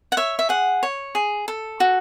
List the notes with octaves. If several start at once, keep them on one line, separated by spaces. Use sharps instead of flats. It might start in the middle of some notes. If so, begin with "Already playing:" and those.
F#5
C#5 E5
E5
G#4 F#5
C#5
G#4
A4
F#4